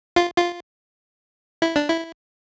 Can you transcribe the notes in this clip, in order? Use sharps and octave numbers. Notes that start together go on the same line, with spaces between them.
F4
F4
E4
D4
E4